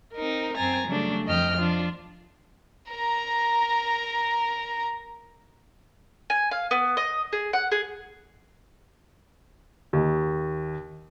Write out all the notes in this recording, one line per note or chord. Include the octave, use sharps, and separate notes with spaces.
C4 D#4 A#4
F#2 C4 G#5 A#5 A6
C#3 F#3 G3 A3 D4
F2 D#5 G5 F6
F3 D4 F4
A#4 A#5
G#5
F5
B3
D#5
G#4
F#5
G#4
D#2